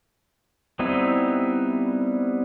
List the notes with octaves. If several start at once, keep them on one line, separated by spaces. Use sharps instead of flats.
G3 B3 C4 D#4 E4